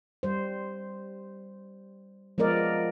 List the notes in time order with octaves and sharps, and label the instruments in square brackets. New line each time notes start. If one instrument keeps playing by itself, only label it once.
[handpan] G3 C5
F3 G#3 B3 A#4 D5 D#5